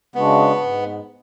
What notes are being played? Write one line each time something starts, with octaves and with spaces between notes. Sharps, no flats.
C#3 G#3 B3 D4 F#4
G#2